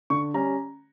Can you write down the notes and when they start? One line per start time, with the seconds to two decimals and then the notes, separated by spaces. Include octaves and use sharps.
0.10 D3 C#6
0.34 G3 C#4 A#5